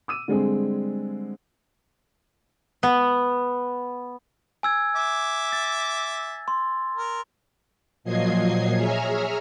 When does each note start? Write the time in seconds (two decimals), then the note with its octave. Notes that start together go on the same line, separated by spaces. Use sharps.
0.08 D6 E6 D#7
0.28 D3 G3 G#3 C4 G#4
2.83 B3
4.63 G#5 E6 G#6
4.95 E5 D6
5.53 A6
6.48 C6
6.96 A#4
8.04 A#2 F3 F#3 D#5 G#6 C7
8.76 G#4 C#5 E5 G#5 A#5 F6